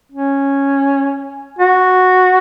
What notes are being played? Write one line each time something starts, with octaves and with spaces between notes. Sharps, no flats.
C#4
F#4